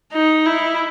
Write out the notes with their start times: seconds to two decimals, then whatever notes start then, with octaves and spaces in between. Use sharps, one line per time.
0.13 D#4
0.46 E4